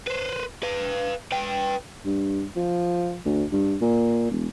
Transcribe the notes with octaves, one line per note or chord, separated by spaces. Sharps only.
B4 C5
B4 F5
B4 G5
G2
F3
D2
G2
A#2
E1